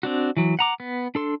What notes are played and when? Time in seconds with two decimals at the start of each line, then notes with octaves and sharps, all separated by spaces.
0.03 C4 D4 F#4
0.37 E3 F#3
0.59 F#5 A#5 D6
0.80 B3
1.15 D4 A4 C6